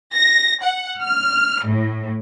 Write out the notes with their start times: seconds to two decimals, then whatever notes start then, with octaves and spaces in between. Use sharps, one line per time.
0.14 A#6
0.63 F#5
1.01 F6
1.64 A2